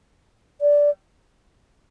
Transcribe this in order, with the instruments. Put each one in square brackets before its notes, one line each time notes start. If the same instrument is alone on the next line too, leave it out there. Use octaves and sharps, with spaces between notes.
[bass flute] D5